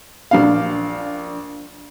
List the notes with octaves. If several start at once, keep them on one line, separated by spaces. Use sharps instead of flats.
A#1 D4 F5